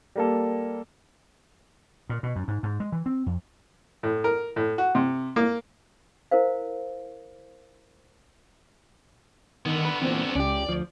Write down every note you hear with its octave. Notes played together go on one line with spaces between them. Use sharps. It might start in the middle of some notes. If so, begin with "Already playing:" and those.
G3 A#3 A4
A#2
B2
F#2
G#2
G#2
G#3
E3
C4
F2
A2
A#4
A2
F#4
C3
A#3
E4 A#4 C5 F5
D3 D#3 B3
B4
E2 A#2 C4
C#2 C#4 G4 D5
D2 F3